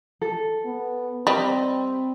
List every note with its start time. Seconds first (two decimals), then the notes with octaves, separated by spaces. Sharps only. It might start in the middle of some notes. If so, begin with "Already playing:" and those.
0.22 A4
0.66 B3
1.27 G3 C4 D#5